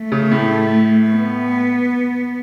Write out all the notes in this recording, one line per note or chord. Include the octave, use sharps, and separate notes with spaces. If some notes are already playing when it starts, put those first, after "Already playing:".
Already playing: A3
C#3
A2
B3